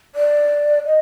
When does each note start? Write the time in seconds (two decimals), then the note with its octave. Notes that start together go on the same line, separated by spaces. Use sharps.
0.15 D5
0.86 D#5